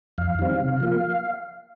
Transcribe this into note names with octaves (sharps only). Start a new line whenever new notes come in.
F2 F5
D#3 G3 C4
C3
F3 A#3